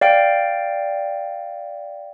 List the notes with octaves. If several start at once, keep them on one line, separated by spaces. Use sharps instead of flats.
D5 F5 G5